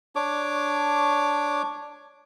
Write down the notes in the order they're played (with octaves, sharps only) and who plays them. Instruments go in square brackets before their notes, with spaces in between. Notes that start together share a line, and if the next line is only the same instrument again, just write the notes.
[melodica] D4 C#5 D6